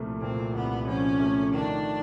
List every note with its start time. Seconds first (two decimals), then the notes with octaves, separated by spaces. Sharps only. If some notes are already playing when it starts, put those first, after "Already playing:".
Already playing: C2 A#2 F3 A3
0.21 A#2 C4
0.54 C2 B3
0.87 F3 C#4
1.20 A3
1.53 D#3 D4